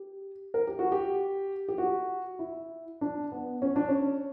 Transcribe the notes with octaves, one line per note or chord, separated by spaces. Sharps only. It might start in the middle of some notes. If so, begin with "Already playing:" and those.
Already playing: G4
A#4
G4
F#4
G4
G4
F#4
E4
D4
B3
C#4
D4
C#4